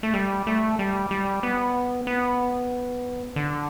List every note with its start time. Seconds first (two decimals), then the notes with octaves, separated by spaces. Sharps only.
0.03 A3
0.14 G3
0.47 A3
0.79 G3
1.11 G3
1.43 B3
2.07 B3
3.36 D3